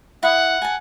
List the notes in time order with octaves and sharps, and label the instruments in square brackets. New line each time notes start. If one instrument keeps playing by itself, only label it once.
[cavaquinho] E4 D#6 [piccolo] F#5
[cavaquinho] G#5 A5